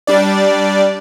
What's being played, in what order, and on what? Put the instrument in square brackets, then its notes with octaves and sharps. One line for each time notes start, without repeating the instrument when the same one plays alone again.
[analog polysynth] G3 D4 D5